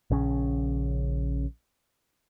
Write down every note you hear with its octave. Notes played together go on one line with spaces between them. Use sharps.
A#1 C#3 C#4